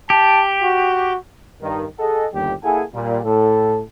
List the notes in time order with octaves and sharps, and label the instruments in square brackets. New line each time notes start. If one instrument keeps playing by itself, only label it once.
[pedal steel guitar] G4 [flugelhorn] A5
[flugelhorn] F#4
[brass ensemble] G2 D#3
G#4 A4 D#5 F#5
G1 D#2 G3 G4
A#3 E4 G#4 A4 F#5 G#5
A#2 G3
A2 A4